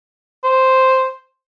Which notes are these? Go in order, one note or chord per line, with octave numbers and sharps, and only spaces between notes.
C5